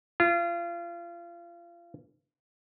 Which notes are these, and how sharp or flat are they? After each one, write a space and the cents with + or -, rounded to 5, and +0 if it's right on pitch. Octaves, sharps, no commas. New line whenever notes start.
F4 -30